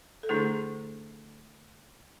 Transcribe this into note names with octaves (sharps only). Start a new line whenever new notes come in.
A4
D3 A3 D4 E4 G#4